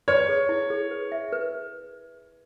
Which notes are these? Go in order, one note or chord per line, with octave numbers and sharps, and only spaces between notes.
B4 C#5
G#4
E4
G#4
B4
E5
B4